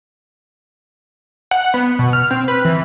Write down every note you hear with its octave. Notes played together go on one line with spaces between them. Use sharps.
F#5
B3
B2
F6
C4
B4
E3